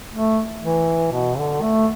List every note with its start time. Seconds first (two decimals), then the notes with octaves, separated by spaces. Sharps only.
0.14 A3
0.63 E3
1.12 B2
1.38 D3
1.62 A3